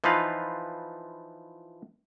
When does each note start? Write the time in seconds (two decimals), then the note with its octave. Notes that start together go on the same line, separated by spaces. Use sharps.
0.04 E3 F3 D#4 F4 B4 F5